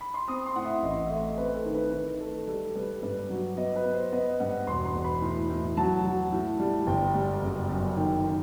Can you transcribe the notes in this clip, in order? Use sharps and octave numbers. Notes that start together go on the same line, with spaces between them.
B5
C6
C4 D#6
C6
A2 F#5
E5
A1 D#5
E5
A3 D#5
C4 B4
A4
D#3
B4
D#3 B4
A3 A4
G3 A4
G3 B4
G2 B4
F#3
B3 D#5
B4
B3
C5
B3 D#5
G2 F#5
E1 C6
C6
E1
B5
A2
A2
F#3 A5
F#3
A2
G3
G1 G5
G3
F#1
F#2
D#3 G5
D#3